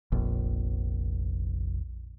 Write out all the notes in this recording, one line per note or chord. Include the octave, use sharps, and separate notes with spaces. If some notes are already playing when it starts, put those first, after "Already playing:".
F1 A#1